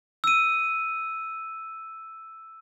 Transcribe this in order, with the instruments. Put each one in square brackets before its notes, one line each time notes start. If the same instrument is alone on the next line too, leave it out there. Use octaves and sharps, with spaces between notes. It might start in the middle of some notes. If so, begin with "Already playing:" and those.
[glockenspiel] E6 D#7